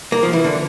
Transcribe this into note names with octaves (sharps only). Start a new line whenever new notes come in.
A#3
F3
E3
D3